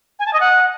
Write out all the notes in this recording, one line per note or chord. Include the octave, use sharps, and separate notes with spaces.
G#5
A5
D#5
F#5